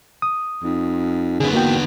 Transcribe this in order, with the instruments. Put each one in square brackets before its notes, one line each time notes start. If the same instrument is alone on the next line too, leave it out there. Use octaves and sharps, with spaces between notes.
[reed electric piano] D#6
[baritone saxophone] F2 [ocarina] D#4
[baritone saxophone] F#2 [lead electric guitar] D3 B3 [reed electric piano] G#4
[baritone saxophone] E2 [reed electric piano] A#3 F#4 G5